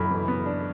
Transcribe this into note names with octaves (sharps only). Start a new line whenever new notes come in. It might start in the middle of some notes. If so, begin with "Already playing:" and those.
Already playing: F#2 B5
E3
B3
D4